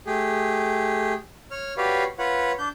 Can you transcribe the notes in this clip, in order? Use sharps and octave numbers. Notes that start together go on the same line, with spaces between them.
A3 G4 G#4
C#5 F6
F#4 G4 B4 C#5 D5 F5
F4 B4 C#5 F#5
D4 G6